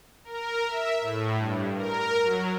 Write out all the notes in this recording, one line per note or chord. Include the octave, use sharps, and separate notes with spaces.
A#4
E5
A2
G2
A#4
F#3